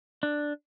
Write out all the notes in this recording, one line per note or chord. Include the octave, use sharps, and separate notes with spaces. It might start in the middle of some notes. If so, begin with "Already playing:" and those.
D4